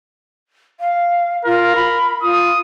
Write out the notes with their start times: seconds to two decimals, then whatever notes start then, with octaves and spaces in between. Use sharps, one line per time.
0.80 F5
1.45 F4 A#4
1.76 B5
2.22 F4 D#6